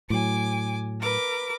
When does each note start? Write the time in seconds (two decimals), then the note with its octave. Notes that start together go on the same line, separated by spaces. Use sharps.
0.10 A2 F#3 G#5 D6
1.02 A#4 B4 D6